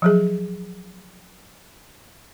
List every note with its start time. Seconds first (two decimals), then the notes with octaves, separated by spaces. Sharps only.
0.02 F3 F#3 G#4